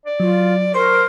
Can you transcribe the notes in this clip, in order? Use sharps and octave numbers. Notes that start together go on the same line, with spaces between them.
D5
F#3 F4
A#4 C5 C#6